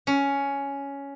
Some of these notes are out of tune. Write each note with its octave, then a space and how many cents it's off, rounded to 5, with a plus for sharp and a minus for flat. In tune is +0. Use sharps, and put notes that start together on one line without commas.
C#4 +10